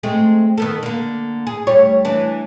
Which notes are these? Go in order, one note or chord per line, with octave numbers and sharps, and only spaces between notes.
G#3 A3 C4
D#3 B3 A4
D3 A#3
G#4
D2 G3 C#5
E3 D4